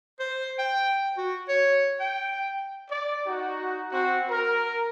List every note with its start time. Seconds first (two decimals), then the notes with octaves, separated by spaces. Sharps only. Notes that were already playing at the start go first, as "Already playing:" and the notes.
0.20 C5
0.59 G5
1.17 F#4
1.49 C#5
2.00 G5
2.90 D5
3.27 D#4 F#4
3.91 C4 F#4
4.29 A#4